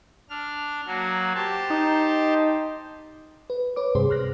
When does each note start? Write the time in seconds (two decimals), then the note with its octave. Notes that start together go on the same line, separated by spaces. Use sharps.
0.30 D4 F6
0.87 F#3 A#3 F#4
1.35 G4 C5 A5
1.70 D#4
3.50 B4
3.76 B4 C#5 D6
3.95 G2 C3 G#4 C5 C6
4.10 C6 F6 F#6 A#6